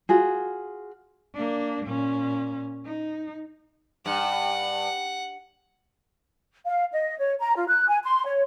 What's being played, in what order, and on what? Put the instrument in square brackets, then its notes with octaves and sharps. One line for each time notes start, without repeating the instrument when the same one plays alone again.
[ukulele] F4 F#4 G#4
[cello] A#3 D4
A#2 C#4
D#4
[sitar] G2 [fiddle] F#5
[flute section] F5
D#5
C#5
A#5
F4
F#6
G#5
C6
C#5